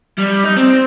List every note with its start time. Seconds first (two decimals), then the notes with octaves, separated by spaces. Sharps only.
0.18 G3
0.43 D#4
0.56 C4